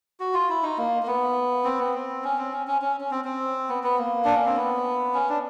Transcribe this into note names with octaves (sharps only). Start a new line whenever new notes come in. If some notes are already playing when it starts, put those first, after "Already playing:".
F#4
F4
E4
D#4
A#3
A#3
B3
C4
B3
C4
C#4
C4
C#4
C#4
C#4
C#4
C4
C4
B3
B3
A#3
D4
C#4
C4
B3
C#4
D4